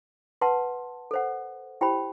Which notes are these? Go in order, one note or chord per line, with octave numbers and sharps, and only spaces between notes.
B4 F#5 A5 C6
A4 C5 F#5
E4 G4 C5 G5 B5